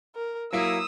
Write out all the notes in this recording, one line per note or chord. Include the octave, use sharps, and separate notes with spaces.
A#4
F#3 A#3 E4 D#6 E6